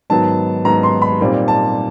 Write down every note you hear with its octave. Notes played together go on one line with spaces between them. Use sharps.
G#2 D#3 F#3 B3 A5
G#2 D#3 F#3 B3 A#5
C6
B5
A#2 G3 C4 D#4
A5